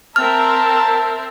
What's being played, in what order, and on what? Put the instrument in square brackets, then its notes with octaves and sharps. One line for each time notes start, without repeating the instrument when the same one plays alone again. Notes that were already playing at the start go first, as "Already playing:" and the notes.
[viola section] C4 A#4 E5 [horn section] A5 [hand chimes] F6